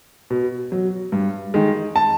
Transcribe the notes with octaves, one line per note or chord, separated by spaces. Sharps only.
B2
F#3
G2
D#3 G#3
A5